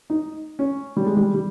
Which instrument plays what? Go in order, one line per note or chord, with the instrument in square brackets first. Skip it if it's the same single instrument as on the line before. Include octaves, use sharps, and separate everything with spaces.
[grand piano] D#4
C#4
G3
G#3
G3
G3